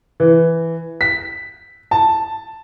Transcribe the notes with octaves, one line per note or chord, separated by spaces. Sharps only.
E3
B6
A5